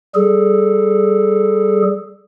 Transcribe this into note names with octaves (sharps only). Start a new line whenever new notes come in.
G3 G#4 A4